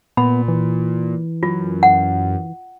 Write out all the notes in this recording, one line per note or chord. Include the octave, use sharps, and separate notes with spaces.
A#2 B3 B5
E3
F#2 F4
F#5